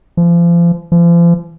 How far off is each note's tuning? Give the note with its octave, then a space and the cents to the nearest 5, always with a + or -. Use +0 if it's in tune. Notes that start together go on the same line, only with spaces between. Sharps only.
F3 -35
F3 -40